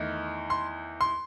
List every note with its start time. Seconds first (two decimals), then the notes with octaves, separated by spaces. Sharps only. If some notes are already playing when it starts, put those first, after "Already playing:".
Already playing: E2 D#3 A3 D#4
0.50 C6
1.01 C6